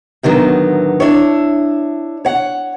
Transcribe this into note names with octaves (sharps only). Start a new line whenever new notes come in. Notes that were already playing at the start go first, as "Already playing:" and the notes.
A2 D3 D#3 F#3 B3
D4 E4 C#5
C#5 F#5